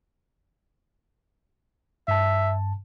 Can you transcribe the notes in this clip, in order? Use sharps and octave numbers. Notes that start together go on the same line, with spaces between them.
G2 E5 A5